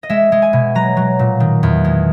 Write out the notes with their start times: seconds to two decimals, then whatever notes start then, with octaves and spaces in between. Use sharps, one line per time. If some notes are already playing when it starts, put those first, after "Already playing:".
0.03 D#5
0.09 G#3 E5
0.32 G#3
0.42 G#5
0.53 B2
0.75 F#3 A#5
0.97 F#3
1.19 A#2
1.40 D#3
1.63 E2
1.84 G#3